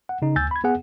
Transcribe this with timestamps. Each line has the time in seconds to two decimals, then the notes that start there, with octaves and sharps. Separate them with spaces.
0.09 F#5
0.22 C#3 D#4
0.36 D2 G#5 E6 G6 A6
0.51 B5 G#6
0.64 B3 G#4 F#5 G#5